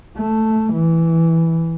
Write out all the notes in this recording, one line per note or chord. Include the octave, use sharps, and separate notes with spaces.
A3
E3